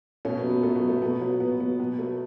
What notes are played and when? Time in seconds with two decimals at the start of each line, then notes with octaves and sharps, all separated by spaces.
0.25 B2 A3 C#4
0.37 B3
0.44 F#3
0.50 B3
0.63 B2 A3
0.76 B3
0.82 F#3
0.89 A3
1.02 B2 B3
1.21 F#3 B3
1.40 B2 B3
1.60 F#3 B3
1.79 B2 B3
1.99 F#3 A3